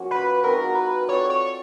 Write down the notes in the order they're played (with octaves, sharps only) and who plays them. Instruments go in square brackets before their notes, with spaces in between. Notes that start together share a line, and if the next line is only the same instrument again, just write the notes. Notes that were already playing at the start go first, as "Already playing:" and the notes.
Already playing: [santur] F3 A#3 C#4 F#4
[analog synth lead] B4
[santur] G#3 C4 D#4 F#4 [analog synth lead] A#4
[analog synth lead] B4
[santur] C4 F4 A4 D5 [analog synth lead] C#5
[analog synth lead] C#5